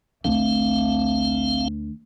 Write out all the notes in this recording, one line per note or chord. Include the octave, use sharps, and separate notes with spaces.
A1 D2 C4 F5